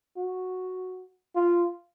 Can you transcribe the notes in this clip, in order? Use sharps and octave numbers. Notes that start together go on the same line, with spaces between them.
F#4
F4